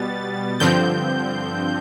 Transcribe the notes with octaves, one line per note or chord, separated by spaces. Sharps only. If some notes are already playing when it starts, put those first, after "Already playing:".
Already playing: B2 G3 B3 A6
G2 D3 F3 C4 G6